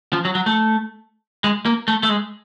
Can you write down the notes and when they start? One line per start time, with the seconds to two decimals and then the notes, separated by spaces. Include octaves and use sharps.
0.13 F3
0.25 F#3
0.35 F#3
0.46 A3
1.44 G#3
1.66 A#3
1.88 A3
2.03 A3
2.09 G#3